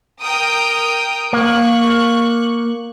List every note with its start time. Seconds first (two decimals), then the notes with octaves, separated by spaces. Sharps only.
0.20 A#4 G5 D#6
1.33 A#3 C#6 F#6